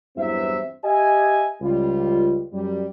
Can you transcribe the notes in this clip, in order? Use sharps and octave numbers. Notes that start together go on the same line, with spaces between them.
E2 G2 F#3 C4 E4 E5
G4 D#5 E5 G#5
C#2 G3 F4
F#2 G3